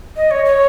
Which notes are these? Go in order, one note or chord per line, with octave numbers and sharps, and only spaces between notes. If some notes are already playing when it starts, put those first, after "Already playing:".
D#5
C#5
C#5